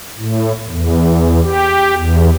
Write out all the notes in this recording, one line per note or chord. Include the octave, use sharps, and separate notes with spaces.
A2
E2
G4
E2